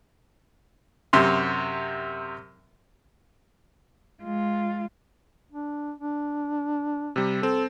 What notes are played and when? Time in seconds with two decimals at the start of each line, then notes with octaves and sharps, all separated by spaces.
1.13 F#2 C3 C6
4.22 G#3 F4
5.52 D4
5.98 D4
7.16 C3 G3
7.43 C4 A4